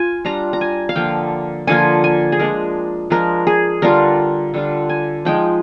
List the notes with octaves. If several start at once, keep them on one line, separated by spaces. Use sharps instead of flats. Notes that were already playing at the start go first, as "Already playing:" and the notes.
Already playing: F4 G#5
G3 D4 F4 A#5
A#5
G#5
F5
D3 F3 A#3 F4 G5
D3 F3 A#3 F4 G#5
G#5
G#4
F3 G#3 D4 A#4
F3 G#3 D4 A#4
G#4
D3 G3 D4 F4 A#4
D3 G3 D4 F4
G#5
F3 G#3 D#4 G5